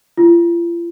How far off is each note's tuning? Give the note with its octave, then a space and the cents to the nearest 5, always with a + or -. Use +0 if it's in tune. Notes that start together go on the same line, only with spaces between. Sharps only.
F4 -40